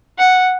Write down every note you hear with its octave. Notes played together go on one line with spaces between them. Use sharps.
F#5